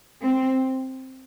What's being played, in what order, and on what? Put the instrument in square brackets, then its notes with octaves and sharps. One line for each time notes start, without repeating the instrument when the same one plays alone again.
[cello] C4